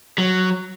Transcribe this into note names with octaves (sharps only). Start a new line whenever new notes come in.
F#3